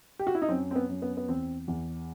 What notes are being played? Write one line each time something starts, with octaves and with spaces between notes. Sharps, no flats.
G4
F#4
E4
D#4
F#2 C4
C4
B3
F#2
B3
B3
E2 C4
E2